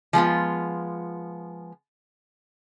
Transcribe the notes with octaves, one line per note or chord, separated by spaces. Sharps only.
F3 G#3 B3 F4